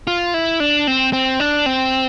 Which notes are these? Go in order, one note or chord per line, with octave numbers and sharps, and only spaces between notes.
F4
E4
D4
C4
C4
D4
C4